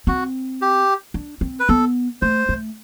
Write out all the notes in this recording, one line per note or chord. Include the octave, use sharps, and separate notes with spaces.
C4 F#4
G4
D4
C4
B4
B3 A4
A3 C5
A3